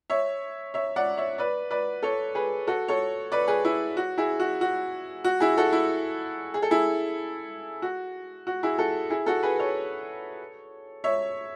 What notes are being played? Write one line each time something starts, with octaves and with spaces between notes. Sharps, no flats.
C#5 E5
C#5 E5
D5 F#5
C#5 E5
B4 D5
B4 D5
A4 C#5
G#4 B4
F#4 A4
A4 C#5
B4 D5
G#4 B4
E4 G#4
F#4
E4 G#4
F#4
F#4
F#4
E4 G#4
F#4 A4
E4
G#4
A4
E4 G#4
F#4
F#4
E4 G#4
F#4 A4
E4 G#4
F#4 A4
G#4 B4
A4 C#5
C#5 E5